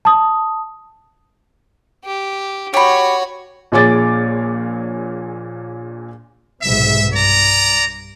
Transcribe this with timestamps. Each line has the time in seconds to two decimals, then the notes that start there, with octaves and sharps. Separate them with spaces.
0.05 A5 D#6
2.05 G4
2.74 F#4 G4 C#5 B5
3.72 A#1 A#2 G#4 C#5 D6 A6
6.62 B1 G#2 C3 E5
7.14 G2 D5 A#5